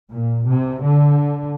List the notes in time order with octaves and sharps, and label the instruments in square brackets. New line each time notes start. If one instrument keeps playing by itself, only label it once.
[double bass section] A#2
C3
D3